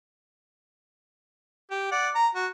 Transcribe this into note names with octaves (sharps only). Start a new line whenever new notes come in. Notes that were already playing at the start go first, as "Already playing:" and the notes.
G4
D5 F#5
A#5
F#4